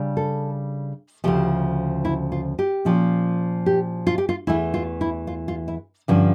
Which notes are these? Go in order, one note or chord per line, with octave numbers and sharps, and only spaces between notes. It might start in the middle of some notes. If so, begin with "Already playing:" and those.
Already playing: C#3 G3 D4
A4
D2 C#3 F3 G4
E4
F4
G4
A#2 F3 C#4
G4
F4
G4
F4
E2 E3 A3 E4
F4
E4
F4
F4
E4
G2 D3 F3 C#4